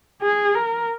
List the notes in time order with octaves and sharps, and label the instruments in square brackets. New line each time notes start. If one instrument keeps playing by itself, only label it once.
[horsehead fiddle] G#4
A#4